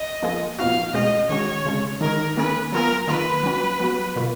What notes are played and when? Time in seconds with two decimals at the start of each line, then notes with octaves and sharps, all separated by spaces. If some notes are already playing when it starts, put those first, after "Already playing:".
Already playing: D#5
0.22 F3 A#3 F4 G#4
0.58 A#2 F3 B3 D#4 F#4 F5
0.94 B2 G#3 C#4 F#4 D#5
1.29 D#3 G#3 C#4 F#4 C#5
1.66 C#3 G#3 C#4
2.01 D#3 G#3 D#4 A#4
2.37 D#3 A#3 C#4 G#4 B4
2.72 F#3 B3 F4 G#4 A#4
3.08 D#3 A#3 F4 G#4 B4
3.43 F#3 C#4 F#4
3.80 F#3 B3 F#4
4.16 B2 A#3 F4